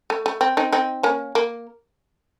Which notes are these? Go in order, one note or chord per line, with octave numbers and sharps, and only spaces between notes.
A3
A3
C4
C4 D#4
C4 D#4
A#3 C#4
A#3